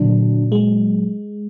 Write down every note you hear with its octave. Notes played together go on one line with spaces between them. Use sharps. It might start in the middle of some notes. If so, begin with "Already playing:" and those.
Already playing: A#2 D3 F#3 D4
G#3